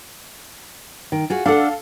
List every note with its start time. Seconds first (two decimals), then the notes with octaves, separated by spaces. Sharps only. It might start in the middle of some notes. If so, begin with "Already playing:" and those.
1.12 D#3
1.30 F4 F#4 G#4
1.46 D4 A4 F5 F#5